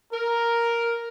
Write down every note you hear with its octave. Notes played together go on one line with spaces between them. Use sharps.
A#4